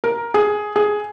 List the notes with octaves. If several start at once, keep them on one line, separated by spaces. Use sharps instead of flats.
A#4
G#4
G#4